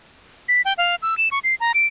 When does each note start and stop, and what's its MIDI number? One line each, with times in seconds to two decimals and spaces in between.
0.49 0.62 95
0.65 0.73 79
0.78 0.95 77
1.02 1.17 88
1.18 1.29 100
1.31 1.39 85
1.44 1.55 96
1.60 1.72 82
1.74 1.87 98